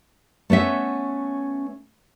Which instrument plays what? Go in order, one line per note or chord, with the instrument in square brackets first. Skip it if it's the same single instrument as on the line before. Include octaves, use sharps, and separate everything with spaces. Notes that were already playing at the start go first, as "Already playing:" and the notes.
[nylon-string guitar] A3 B3 C#4 E5